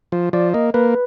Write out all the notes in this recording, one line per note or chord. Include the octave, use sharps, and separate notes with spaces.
F3
F3 D5
A#3 D#5
A#3 B4